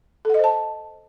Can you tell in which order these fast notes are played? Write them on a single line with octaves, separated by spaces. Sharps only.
A4 F#5 D#5 C5 A5